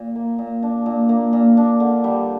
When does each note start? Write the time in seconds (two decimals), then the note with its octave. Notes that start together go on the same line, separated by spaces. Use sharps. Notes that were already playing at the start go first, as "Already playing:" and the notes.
Already playing: A#2
0.15 A#3
0.39 A#2
0.63 D4
0.86 A#2
1.09 A#3
1.33 A#2
1.57 D4
1.80 D3
2.04 G3